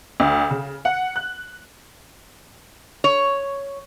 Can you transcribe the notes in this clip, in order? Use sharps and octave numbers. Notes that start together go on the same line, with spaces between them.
D2
C#3
F#5
F#6
C#5